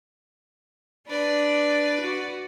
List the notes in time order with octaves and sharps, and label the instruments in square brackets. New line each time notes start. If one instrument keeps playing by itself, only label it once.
[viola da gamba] D4 [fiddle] B4 D5
[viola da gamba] F#4